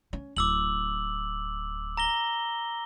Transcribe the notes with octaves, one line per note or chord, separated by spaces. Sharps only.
C#4
D1 D6 E6 F#7
A#5 A#6 G7